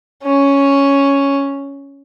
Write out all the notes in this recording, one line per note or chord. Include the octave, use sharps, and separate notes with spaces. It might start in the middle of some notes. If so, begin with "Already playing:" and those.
C#4